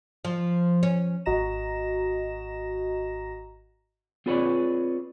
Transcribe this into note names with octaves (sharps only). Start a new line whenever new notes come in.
F3
C#4
G#1 F#4 D#5 A#5 A#6 E7
C4 F4 G#4 B4 C#5 D5